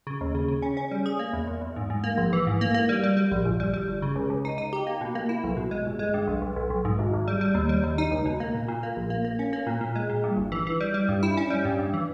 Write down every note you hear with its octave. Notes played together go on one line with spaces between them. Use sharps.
C#3
D#2
C#3
C#3
C#4
C#4
G3
G#4
A#3
E2
E2
E2
G#2
G#2
A#3
A#1
E3
G#2
A#3
A#3
G3
G3
G3
A#1
G1
G3
G3
G1
C#3
C#2
C#2
D#4
D#4
G4
A#3
B2
A#3
E4
B1
B2
G#3
G1
G#3
G2
B1
B1
B1
B1
G#2
G#1
G#1
G3
G3
D#2
G3
D#2
D#4
C#2
B2
A#3
A#2
A#2
A#3
A#1
A#3
A#3
C#4
A#3
A#2
A#2
G#3
A#2
G2
G1
E3
E3
G3
G3
G2
E4
C#4
G3
G2
G2
E3